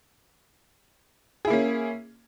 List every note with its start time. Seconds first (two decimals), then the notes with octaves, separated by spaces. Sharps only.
1.45 G#4
1.47 E4
1.50 A#3
1.53 C#4